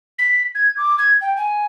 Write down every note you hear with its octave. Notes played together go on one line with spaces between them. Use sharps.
B6
G#6
D6
G#6
G5
G#5